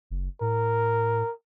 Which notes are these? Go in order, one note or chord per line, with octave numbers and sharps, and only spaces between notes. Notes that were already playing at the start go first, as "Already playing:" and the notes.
F#1
A2 A#4